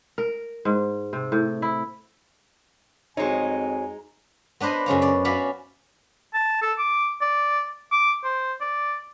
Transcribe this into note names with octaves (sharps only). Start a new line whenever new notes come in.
A#4
G#2
C3
A2
E4
F2 G#3 D#4 F#4 C5 C#5 G#5
B3 D4 B4 C5 D#5
F#2 C#3 C#4 F5
D5
C#4 F#4 D5 E5 F5 B5
A5
A4
D6
D5
D6
C5
D5